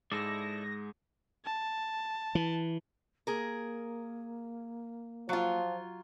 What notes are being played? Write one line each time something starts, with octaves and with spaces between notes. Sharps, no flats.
G#2 G#3 E4 A4 D5 A#6
A5
E3
A#3 G#4 A#4
F3 F#3 F4